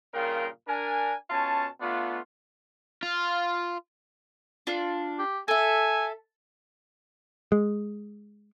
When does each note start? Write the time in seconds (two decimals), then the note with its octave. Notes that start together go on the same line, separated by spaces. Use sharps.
0.14 G2 A#2 C#3 A#4 F5 G5
0.68 D4 A#4 G#5
1.30 B2 C#4 F4 A5
1.81 A3 B3 D4 F4
3.03 F4
4.67 D4 F4
5.19 G4
5.48 A4 E5 G#5
7.52 G#3